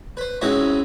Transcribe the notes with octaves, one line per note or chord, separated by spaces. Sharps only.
B4 C5
G#2 G#3 C4 C#4 E4 F#4